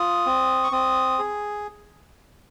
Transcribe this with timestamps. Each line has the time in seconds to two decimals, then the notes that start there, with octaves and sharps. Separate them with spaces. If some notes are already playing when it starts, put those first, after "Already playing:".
Already playing: F4 D#6
0.26 C4
0.64 C#6
0.72 C4 D#6
1.19 G#4